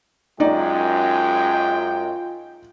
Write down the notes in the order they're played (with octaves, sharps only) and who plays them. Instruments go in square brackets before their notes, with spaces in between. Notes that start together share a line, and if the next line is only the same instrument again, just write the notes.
[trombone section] F#2 G#3 [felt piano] D#4 D5 [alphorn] F4 [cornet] G5